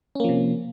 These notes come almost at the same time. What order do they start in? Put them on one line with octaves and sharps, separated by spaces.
C#4 A#3 F3 C3